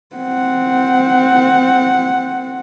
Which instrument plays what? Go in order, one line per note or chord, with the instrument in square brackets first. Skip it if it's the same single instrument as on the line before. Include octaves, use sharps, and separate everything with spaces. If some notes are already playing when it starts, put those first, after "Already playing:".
[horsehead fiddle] C4 F#5